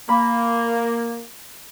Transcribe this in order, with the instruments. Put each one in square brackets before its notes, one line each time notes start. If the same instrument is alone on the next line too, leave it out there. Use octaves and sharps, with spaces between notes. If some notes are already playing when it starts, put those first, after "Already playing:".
[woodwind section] A#3 [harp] B5